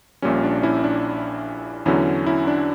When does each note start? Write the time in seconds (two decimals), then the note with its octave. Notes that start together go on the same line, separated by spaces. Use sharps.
0.22 A#1 A#2 G3 C#4
0.43 D4
0.63 C#4 E4
0.84 D4
1.86 E2 D3 F#3 C#4 E4
2.26 C#4 E4
2.47 D4